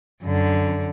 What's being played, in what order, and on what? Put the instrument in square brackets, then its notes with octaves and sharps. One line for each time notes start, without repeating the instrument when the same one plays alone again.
[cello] F#2 D3